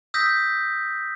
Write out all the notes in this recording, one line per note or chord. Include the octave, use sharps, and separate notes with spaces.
D#6 E6 G6 A#6 B6